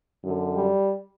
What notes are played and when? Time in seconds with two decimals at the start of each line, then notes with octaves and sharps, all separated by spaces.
0.22 F#2 D3
0.55 G3